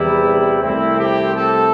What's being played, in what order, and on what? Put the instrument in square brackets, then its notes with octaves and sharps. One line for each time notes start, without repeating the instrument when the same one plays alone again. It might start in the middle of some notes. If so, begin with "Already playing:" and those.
Already playing: [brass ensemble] E2 C3 G3 E4
C2 C3 A3 C4 E4
G4
A4